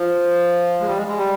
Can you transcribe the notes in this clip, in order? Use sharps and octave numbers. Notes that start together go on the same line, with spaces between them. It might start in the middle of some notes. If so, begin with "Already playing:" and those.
Already playing: F3
G#3
G3
G#3
G#3
G3